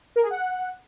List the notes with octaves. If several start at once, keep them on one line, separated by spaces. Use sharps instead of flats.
A#4
G#4
F#5